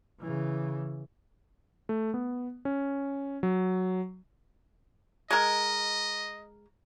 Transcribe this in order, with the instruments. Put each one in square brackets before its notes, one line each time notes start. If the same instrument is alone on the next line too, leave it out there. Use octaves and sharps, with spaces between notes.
[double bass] C#3 E3
[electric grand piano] A3
B3
C#4
F#3
[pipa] G#3 A#4 [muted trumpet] D#5